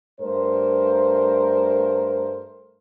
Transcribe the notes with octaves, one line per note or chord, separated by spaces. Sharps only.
G2 A3 A#4 C5